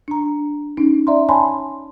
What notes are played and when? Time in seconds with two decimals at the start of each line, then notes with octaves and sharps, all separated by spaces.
0.08 D4 A#5
0.77 C#4 D#4
1.07 D5 E5 A#5 C6
1.29 C#5 G#5 A5 B5 C6